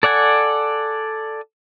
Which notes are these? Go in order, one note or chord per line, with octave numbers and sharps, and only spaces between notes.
A4 D5 F#5 G#5